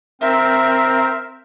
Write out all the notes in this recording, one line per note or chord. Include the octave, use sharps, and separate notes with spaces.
C4 A#4 E5